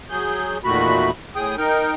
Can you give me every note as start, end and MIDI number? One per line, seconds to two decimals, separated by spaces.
0.10 0.58 54
0.10 0.58 68
0.10 0.58 91
0.64 1.10 40
0.64 1.10 46
0.64 1.10 51
0.64 1.10 57
0.64 1.10 66
0.64 1.10 83
1.35 1.56 45
1.35 1.56 68
1.35 1.56 79
1.35 1.56 87
1.58 1.95 63
1.58 1.95 70
1.58 1.95 79